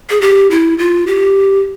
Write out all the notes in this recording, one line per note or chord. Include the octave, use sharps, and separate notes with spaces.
G#4
G4
E4
F4
G4